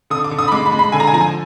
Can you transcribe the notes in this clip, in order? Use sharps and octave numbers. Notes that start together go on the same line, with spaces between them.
D3 D#6
D6
D3
D#6
B5
G#3 D6
B5
G#3
B5
D3 G#5
A#5
G#5
F3 A#5
G#5